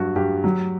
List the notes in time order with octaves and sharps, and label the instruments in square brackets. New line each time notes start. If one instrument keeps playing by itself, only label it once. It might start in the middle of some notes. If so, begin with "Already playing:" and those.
Already playing: [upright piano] G2 F#3 F#4
G2 G4
F#3